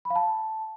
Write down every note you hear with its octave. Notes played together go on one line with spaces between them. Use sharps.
B5
F5
A5